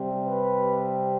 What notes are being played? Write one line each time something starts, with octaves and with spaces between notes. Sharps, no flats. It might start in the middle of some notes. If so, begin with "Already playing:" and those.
Already playing: C3 G3 C4
B4